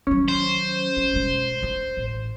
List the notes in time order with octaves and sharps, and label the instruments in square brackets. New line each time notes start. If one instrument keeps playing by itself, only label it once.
[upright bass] D#3 F#3 [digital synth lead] C#4
[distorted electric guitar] C5
[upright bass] B3
B1 G#3
D4
A1